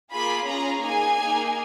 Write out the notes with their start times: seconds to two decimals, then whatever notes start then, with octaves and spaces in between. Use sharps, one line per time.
0.11 A#3 F4 G#4 B5
0.47 C#4 F4 G#4 A#5
0.83 A#3 D#4 G#4 G#5
1.19 A#3 D#4 G#4